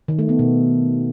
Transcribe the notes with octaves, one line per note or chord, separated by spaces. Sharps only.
D#3
A3
B3
B2